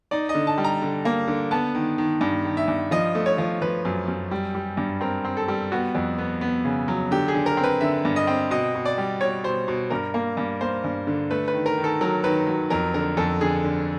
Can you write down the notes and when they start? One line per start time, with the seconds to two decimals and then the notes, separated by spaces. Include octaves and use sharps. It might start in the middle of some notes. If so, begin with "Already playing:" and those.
0.11 D#4 D5
0.29 D#5
0.35 D3
0.47 A5
0.58 G3
0.64 A#5
0.82 D3
1.05 A#3
1.28 D3
1.51 B3 A5
1.75 D#3
1.98 D#3
2.21 G2
2.45 D#3
2.57 E5
2.68 G2
2.91 F3 D#5
3.15 A3
3.26 C#5
3.38 F3
3.62 F3 B4
3.85 F#2
4.08 F#2
4.31 G3
4.55 G3
4.77 G2
5.01 C4 A#4
5.25 C4
5.37 A4
5.48 G3
5.72 B3 F#4
5.95 F2
6.18 B3
6.41 B3
6.65 C#3
6.88 F#3
7.11 D3 G4
7.28 G#4
7.35 D3
7.46 A#4
7.57 C4
7.64 B4
7.81 D3 E5
8.05 G2
8.16 D#5
8.27 C4
8.51 B2 D#5
8.75 B2
8.85 D5
8.98 G3
9.21 B2 C#5
9.44 B2 C5
9.68 B2
9.90 G2 A#4
10.14 A#3
10.37 G2
10.61 A#3 C5
10.84 G2
11.07 D3
11.31 A3 B4
11.48 B4
11.54 D#3
11.66 A#4
11.78 D#3
11.84 A4
12.01 F#3 A#4
12.24 D#3 B4
12.47 F#3
12.70 F2 A#4
12.94 D3 A#4
13.17 F2 A4
13.41 D3 G#4
13.64 D3